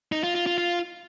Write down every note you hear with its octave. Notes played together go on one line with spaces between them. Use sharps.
D#4
F4
F4
F4
F4